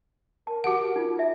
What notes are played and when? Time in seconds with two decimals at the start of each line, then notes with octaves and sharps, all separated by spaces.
0.47 A#4 A5
0.64 F#4 G4 F#5
0.96 D#4 F4
1.19 E5